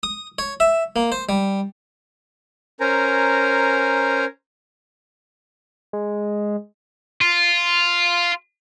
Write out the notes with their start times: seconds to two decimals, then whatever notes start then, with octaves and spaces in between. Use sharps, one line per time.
0.03 D#6
0.39 C#5
0.60 E5
0.96 A#3
1.12 C5
1.29 G3
2.80 C#4 A#4 C5 G#5 A#5
5.93 G#3
7.22 F4